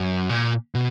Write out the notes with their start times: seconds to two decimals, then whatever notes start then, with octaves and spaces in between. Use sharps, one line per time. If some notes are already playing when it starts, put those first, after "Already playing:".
Already playing: F#2
0.29 A#2
0.75 B2